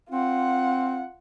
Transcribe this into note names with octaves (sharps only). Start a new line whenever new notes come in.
C4 F4 F#5